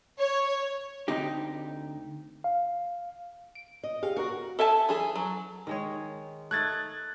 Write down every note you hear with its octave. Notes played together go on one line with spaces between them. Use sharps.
C#5
D2 C4 D#4 G4
F5
D7
D#5
G4 G#4 F5
F#4 A#4 F#5
A4 E5 G#5 A5
E3 G#4 A4
F#3
D#3 G#3 C#5
A3 D#4 F#6 G#6 A6